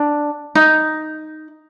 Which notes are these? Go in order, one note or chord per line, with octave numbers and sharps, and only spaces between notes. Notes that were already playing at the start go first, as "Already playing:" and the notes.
Already playing: D4
D#4